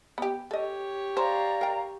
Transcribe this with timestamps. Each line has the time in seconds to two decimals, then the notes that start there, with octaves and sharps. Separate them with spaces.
0.18 B3 G4
0.51 G4 A4 C#5 D#5
1.17 C5 D5 F5 A#5
1.61 A#4 G5